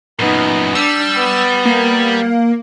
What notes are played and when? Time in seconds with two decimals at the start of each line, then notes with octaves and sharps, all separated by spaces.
0.19 F#2 A#2 B3 D#4
0.75 G3 D4 E6
1.16 B3
1.65 A#3